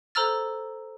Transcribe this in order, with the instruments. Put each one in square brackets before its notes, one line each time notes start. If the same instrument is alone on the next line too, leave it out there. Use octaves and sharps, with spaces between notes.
[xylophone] A4 C5 A#5 E6 F6 A6